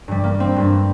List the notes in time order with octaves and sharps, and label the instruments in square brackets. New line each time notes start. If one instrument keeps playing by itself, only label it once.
[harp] G2 G3
A#3
C4
G2 G3